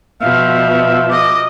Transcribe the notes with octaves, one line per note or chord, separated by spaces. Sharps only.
B2 F3 E5 F5
D#5 D6